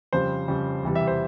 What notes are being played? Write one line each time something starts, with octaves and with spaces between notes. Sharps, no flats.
F2 C#3 G3 C5
F2 C#3 G3
E2 C3 E3 G3
E5
C5